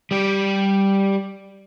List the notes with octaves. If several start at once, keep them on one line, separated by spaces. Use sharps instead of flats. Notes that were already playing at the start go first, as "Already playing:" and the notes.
G3 G4